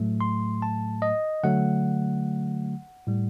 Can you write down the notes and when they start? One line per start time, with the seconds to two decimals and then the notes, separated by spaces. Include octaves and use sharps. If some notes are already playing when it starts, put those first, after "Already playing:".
Already playing: A2 F#3 A3
0.21 C6
0.62 A5
1.02 D#5
1.43 D3 F#3 A3 F#5
3.07 A2 G3